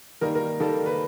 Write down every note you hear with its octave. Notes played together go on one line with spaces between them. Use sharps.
D#3 G3 A#3 A#4
A#4
D#3 G3 A#3 A4
B4